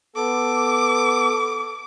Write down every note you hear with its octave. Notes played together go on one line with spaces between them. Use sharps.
B3 A4 D6